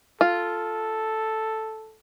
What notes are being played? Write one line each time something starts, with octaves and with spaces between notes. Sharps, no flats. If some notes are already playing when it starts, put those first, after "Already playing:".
F4 A4